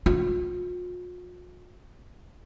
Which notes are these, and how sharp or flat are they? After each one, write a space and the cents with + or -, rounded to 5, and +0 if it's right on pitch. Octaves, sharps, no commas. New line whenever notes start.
F4 +45